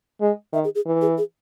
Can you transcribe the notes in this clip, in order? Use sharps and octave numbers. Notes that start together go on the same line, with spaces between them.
G#3
D#3 E5
G#4
G#4
E3
G#4
G#4